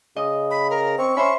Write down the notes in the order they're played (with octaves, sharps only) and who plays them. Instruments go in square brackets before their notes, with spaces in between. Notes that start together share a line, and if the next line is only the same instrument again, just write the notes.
[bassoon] C#3 [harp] D#5
[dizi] B5
A#4
[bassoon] C4 [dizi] C#6
[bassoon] C#4 [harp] C5 E5 B5